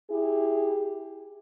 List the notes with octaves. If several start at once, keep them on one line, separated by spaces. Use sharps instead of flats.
E4 G4 G#4